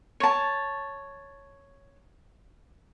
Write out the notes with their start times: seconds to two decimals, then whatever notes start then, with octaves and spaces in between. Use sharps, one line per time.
0.20 C#5 A5